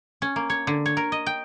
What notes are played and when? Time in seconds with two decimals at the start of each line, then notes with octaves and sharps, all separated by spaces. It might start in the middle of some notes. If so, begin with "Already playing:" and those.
0.22 C#4
0.36 A#3
0.50 C#5
0.67 D3
0.86 C#5
0.97 A#4
1.12 D#5
1.26 G5